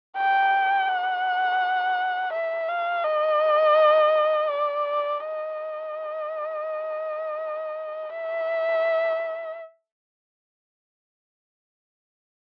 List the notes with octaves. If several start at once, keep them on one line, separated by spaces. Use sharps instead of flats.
G5
F#5
E5
F5
D#5
D5
D#5
E5